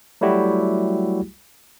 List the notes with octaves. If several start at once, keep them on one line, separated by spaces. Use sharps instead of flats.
F#3 G3 A3 E4 F#4 G4